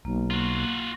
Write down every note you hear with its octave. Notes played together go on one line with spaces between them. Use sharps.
B1 A#3
F4 F#4